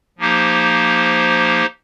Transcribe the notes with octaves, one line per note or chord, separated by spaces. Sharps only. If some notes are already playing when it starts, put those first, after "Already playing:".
F3 A#3 D#4 G4 C5